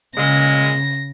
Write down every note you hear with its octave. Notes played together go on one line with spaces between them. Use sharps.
A#2 C#3 G#3 A#6